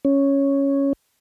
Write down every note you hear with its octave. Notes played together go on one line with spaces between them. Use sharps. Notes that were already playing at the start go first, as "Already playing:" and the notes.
C#4